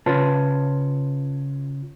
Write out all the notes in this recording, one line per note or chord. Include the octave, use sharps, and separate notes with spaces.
C#3 F4 B4 C#5 A5